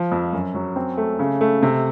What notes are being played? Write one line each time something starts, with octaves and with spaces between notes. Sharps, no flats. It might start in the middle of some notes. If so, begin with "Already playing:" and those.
Already playing: F3
F2
F#2
F#3
C4
A3
C#3
A3
C3